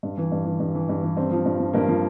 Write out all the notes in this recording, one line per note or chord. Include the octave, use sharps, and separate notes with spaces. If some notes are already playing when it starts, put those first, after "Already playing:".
G2
E3
G2
E3
G2
E3
G2
E3
G2 C4
F3
G2
F3
G2 A#3
F3